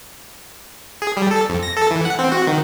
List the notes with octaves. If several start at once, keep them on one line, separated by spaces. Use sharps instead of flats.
G#4
G3
A4
F2
A#6
A4
E3
F#5
C4
F#4
D#3